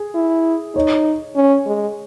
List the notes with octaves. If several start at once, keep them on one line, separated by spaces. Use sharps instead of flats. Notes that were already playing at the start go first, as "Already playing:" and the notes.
Already playing: G#4
E4
D#4 C#5
C#4
G#3